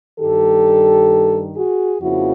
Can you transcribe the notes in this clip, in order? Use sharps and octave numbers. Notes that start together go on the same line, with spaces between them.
G2 D#3 G3 G4 A4
F#4 G#4
F2 C#3 F3 A#3 E4 F#4